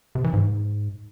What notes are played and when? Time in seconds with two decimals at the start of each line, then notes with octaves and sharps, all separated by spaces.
0.15 C3
0.24 E3
0.33 G#2